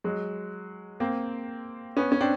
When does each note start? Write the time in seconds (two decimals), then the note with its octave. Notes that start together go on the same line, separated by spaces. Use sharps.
0.04 F#3 G#3
1.00 A#3 C4
1.97 B3 C#4
2.12 C#4
2.21 C4 D4